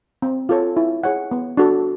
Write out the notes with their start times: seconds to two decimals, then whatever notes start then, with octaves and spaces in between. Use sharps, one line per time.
0.22 C4
0.49 F4 A4 C#5
0.77 E4
1.04 G#4 C#5 F#5
1.32 B3
1.57 D4 F#4 A4